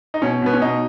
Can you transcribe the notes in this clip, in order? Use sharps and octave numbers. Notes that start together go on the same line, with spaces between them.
D#4
B2 C#4
B2 B3
C#4
B2 D#4